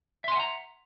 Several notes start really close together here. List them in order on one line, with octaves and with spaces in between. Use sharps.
E5 C6 G#5 F#5 A#5